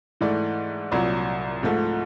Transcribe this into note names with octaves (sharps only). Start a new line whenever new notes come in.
G#2 E3 A3 D5
C2 A#2 F#3 D5
G#2 F3 A3